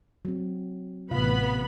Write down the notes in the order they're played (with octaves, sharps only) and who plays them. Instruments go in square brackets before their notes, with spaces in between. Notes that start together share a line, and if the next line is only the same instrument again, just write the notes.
[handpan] F#3 C4
[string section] A1 B3 B5 [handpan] C3 F4 F5